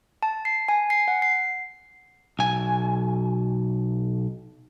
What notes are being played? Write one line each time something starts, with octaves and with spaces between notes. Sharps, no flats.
A5
C7
G#5
C7
F#5
C7
B1 G#5